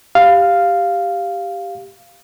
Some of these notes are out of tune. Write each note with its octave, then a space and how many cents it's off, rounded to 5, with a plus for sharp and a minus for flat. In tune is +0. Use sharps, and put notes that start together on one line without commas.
G4 +5 F5 +0